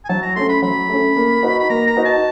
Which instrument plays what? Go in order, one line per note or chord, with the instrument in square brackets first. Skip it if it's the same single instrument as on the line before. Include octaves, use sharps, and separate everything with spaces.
[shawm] G#5
[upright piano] F#3 [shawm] A5
[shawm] A#5
[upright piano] A3 C#4 [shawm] C6
[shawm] B5
[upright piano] F#3 [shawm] B5
[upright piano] A3 C#4
A#3
D#4 F#4 B4
[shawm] B5
[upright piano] A#3 [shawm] A#5
[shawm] A#5
[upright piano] D#4 F#4 B4
[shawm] A5